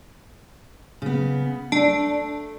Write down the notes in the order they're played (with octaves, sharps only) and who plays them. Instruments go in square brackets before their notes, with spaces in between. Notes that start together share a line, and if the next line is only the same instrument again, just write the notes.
[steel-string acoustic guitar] C#3 B3
[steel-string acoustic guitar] A3 [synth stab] D4